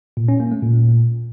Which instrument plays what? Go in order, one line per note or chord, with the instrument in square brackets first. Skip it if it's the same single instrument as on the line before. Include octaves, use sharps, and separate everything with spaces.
[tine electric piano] A#2
C#4
A#3
A3
A#2